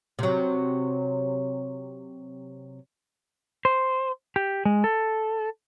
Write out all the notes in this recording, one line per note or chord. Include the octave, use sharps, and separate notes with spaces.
C3 F#3
C5
G4
G#3
A4